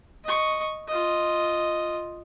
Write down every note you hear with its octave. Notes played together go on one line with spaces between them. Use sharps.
D#5 C#6
F4 D#5